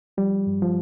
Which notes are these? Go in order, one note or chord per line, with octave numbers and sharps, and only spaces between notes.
F3 G3
G2
F3